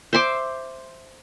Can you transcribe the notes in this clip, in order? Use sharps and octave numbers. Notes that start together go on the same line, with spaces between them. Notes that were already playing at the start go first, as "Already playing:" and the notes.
C5 E5 C6 D6